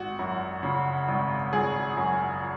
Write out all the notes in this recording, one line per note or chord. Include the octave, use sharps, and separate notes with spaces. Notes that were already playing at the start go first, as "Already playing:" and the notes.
Already playing: G#1 F#4
F#2
C#3
G#1
G#1 G#4
F#2